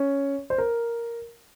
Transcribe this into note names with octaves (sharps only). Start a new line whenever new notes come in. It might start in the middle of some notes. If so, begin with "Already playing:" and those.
Already playing: C#4
C5
A#4